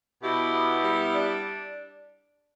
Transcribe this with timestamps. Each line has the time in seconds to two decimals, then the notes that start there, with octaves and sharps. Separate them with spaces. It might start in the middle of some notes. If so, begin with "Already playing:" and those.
0.22 B2 E4 G4
0.53 B3
0.83 G3
1.14 D4